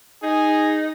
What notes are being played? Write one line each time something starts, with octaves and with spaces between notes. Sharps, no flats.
D#4 G#4